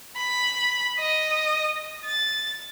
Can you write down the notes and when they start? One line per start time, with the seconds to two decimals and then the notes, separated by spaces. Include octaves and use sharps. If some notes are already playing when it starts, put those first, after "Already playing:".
0.17 B5
0.99 D#5
2.06 A6